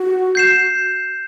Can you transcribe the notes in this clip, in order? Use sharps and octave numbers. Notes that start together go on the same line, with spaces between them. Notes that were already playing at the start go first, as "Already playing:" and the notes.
Already playing: F#4
G6 C7 E7